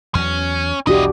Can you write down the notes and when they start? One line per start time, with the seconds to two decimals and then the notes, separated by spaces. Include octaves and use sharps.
0.15 E2 F#3 C#4
0.87 B1 E2 D4 E4 F#4 G4 D#5